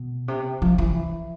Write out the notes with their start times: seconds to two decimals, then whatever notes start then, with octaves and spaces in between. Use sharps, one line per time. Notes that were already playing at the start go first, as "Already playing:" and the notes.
Already playing: B2
0.28 C3
0.62 F3
0.78 E3